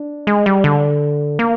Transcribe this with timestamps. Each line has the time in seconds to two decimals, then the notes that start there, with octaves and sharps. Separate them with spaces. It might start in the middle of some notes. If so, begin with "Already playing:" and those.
Already playing: D4
0.27 G#3
0.46 G3
0.64 D3
1.39 A#3